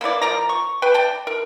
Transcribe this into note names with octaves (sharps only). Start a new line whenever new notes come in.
A#3 B3 E4 D5
F3 A#4 D5 A#5
C#6
B4 G5
D5 G5 A5
A#4